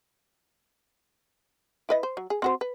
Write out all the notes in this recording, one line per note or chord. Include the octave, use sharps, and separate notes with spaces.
E4 B4 D#5
C5
F#3
G#4
C4 F#4 C5
B4